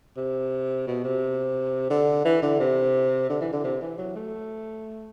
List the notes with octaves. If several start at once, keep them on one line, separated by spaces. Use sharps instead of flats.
C3
B2
C3
D3
E3
D3
C3
D3
E3
D3
C3
E3
F#3
A3